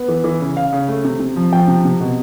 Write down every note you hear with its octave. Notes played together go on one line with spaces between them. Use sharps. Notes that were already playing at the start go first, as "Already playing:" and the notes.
Already playing: B3
E3
E3
C#3
C#3 F5
C#3
A3
C3
C3
F3
F3 G5
C3
C3
B2